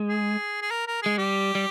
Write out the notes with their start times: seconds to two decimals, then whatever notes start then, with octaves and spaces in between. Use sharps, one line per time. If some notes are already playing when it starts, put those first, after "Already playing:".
Already playing: G#3
0.09 G#4
0.62 G#4
0.71 A#4
0.87 A#4
1.02 G#3 G#4
1.18 G3 G4
1.55 G3